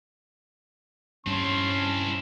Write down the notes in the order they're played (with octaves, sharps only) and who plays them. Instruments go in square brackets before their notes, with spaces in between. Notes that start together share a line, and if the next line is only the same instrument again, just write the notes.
[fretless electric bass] G2 [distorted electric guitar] C4 E4 [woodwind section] C#4 [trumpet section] C#5 A5 C6